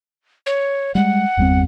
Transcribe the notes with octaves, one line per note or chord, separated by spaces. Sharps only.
C#5
G3 G#3 F#5
G1 E2 G3 C4